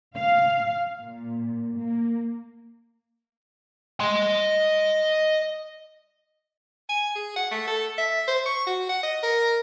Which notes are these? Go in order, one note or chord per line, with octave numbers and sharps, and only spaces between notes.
F5
A#2
A#3
D#5 C6
G#5
G#4
F#5
A3
A4
E5
C5
C#6
F#4
F#5
D#5
A#4